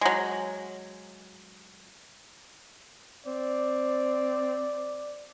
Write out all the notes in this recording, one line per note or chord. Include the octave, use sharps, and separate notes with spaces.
F#3 G#3
C4 D5